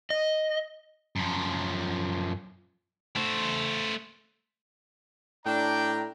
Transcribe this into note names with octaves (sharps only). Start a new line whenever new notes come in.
D#5
F#2 F3
A3 C5
A2 D4 G5 A#5